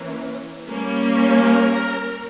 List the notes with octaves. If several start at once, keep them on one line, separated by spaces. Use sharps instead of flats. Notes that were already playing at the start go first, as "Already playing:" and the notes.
Already playing: E3 A#3 C#4
G3 A#3 C#4
A#4